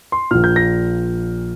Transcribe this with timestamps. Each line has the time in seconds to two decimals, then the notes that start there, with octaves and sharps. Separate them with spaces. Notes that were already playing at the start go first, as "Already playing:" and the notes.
0.12 C6
0.31 A#1 A#2 F6
0.44 G6
0.56 A#6